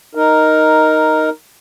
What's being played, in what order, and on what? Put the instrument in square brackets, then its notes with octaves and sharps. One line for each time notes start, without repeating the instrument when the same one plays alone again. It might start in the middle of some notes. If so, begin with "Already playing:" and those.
[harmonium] D#4 A#4